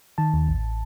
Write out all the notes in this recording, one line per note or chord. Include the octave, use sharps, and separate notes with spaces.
D#3 A5
D#2
A1